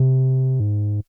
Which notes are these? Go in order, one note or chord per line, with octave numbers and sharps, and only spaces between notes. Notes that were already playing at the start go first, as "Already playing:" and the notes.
Already playing: C3
G#2